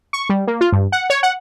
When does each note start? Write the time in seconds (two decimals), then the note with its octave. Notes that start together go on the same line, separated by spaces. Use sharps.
0.13 C#6
0.29 G3
0.47 A#3
0.61 F4
0.72 G2
0.92 F#5
1.10 C#5
1.23 F#5